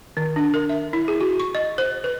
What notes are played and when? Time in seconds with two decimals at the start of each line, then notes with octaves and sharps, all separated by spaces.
0.17 D#3
0.36 D4
0.54 A#4
0.69 E5
0.93 E4
1.08 G#4
1.21 F#4
1.40 C#6
1.55 D#5
1.78 C5
2.04 B4